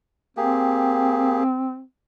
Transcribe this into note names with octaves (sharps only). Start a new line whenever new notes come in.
A#3 C4 G4 G#4